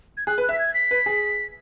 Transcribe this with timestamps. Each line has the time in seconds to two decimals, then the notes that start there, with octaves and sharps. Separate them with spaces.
0.17 G#6
0.27 G#4 F#6
0.38 B4
0.43 F#6
0.49 E5 B6
0.59 G#6
0.74 B6
0.91 B4
1.06 G#4